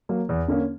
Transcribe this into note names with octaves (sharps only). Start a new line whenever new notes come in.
F#3 A#3
E2
D3 A#3 C#4